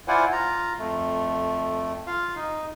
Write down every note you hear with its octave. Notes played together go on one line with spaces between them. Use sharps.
E4 F4 C5 D5 F#5 G#5
F4 A#5
F2 A3
F4 F5
D#4